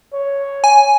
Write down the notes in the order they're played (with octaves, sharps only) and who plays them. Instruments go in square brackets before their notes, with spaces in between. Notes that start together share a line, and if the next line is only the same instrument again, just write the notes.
[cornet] C#5
[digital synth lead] G#5